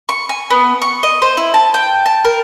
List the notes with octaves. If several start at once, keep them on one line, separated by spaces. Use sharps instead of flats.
C#6
G#5
B3
C#6
D#5
C5
E4
A5
G5
A5
A#4